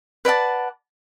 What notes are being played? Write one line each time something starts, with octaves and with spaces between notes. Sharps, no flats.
B4 D5 F#5 A5